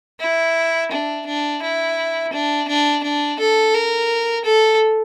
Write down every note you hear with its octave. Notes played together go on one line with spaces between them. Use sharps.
E4
D4
D4
E4
D4
D4
D4
A4
A#4
A4